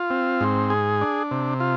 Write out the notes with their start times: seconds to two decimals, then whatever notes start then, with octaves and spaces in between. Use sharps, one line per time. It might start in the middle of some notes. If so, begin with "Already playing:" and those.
Already playing: F4
0.10 C4
0.41 G#2
0.70 G#4
1.01 D4
1.31 C3
1.60 F4